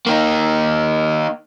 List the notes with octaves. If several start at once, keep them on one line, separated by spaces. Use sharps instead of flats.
A#3 D#4